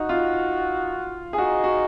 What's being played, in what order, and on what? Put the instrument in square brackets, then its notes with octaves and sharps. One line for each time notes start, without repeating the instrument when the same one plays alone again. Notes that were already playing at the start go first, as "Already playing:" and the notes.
Already playing: [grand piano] D#4 [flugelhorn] F#4
[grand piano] F4
G#4
[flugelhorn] D#4 [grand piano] F#4
[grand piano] F#4